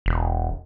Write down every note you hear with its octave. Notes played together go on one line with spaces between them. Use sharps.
E1